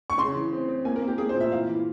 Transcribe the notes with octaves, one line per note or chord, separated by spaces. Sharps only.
C#6
C#3 C6
E3
C4
C4
A#3 G#5
A#4
A#3
G4
A#3 G#4
C5
A#2
E5
E3 F5
E3